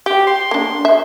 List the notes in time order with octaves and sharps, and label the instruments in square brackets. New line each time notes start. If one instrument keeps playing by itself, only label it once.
[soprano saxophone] G4 [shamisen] G5
[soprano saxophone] C6
[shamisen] A#3 D4
E5